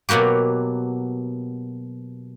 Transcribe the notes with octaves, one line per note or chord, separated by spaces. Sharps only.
B2 F#3 A#3 F#4 G4